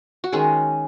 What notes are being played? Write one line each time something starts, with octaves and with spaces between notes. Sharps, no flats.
F#4
D#3 G#3 C#4 G#4